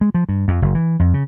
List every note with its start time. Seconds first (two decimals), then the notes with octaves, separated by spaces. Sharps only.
0.01 G#3
0.14 F3
0.29 G2
0.48 F2
0.62 F#1
0.75 E3
0.99 F2
1.14 C#3